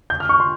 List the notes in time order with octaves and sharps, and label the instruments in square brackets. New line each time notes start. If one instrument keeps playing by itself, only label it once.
[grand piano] G6
F6
C#6
C6